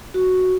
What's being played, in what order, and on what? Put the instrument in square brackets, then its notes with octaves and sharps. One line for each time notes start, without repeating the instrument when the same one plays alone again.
[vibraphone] F#4